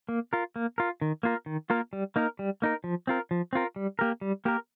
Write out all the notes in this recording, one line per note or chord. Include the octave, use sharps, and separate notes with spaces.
A#3
F4 A#4
A#3
F4 A#4
D#3
A#3 F4 A#4
D#3
A#3 F4 A#4
G3
A#3 D#4 A#4
G3
A#3 D#4 A#4
F3
C4 F4 A#4
F3
C4 F4 A#4
G3
A#3 G4 A#4
G3
A#3 G4 A#4